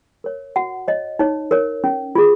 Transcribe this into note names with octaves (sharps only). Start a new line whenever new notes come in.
A#4 C#5
F#4 F#5
C#5 D#5
D#4 C#5
A#4 C#5
C#4
F4 G#4